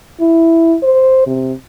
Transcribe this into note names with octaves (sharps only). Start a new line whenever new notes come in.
E4
C5
C3